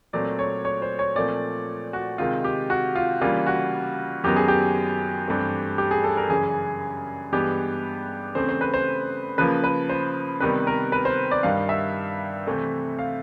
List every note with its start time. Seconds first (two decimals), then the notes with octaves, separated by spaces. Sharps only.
0.13 A#2 F#3 A3 C4 D5
0.39 C#5
0.65 C#5
0.82 C5
0.99 C#5
1.16 A#2 F3 A3 C4 D5
1.93 F#4
2.18 C3 D#3 G#3 F4
2.44 G4
2.70 F#4
2.95 F4
3.21 C#3 E3 G3 A#3 F4
3.46 F#4
4.24 F#2 D#3 F#3 B3 G4
4.36 G#4
4.48 G4
5.28 G2 E3 A3 C4
5.78 G4
5.91 G#4
6.04 A4
6.17 A#4
6.29 F#2 C#3 E3 G#4
7.32 G2 E3 G#3 B3 G4
8.35 C#3 E3 A3 C4 C5
8.49 C5
8.61 B4
8.74 C5
9.38 C#3 F3 A#3 B4
9.64 B4
9.89 C5
10.40 C3 D#3 G3 B3 B4
10.67 A#4
10.92 B4
11.05 C5
11.31 D5
11.43 G2 D#3 G3 F5
11.69 E5
12.47 C3 E3 A3 C4
12.99 F5